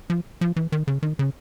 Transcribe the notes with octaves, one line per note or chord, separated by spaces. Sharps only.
F3
F3
E3
D#3
C#3
D#3
C#3